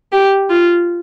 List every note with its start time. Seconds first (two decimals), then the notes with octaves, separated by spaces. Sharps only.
0.12 G4
0.50 F4